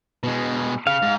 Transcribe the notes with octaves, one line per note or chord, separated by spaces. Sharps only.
B2 G#3
C#3 F5
G#2